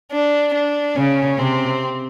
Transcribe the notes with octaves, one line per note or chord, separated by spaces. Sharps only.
D4
D4
C#3 C#4
C3 C4